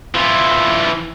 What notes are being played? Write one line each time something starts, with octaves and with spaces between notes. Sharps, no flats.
E3 F4